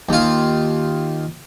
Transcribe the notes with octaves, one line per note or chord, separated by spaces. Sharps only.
D#2 F4